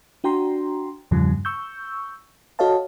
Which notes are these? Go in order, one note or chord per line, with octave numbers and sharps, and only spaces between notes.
D4 F#4 G5 A#5 C6
E2 G2 A#2 C#3 F3 G3
C#6 E6 G6
F#4 A4 C#5 D#5 F5 A5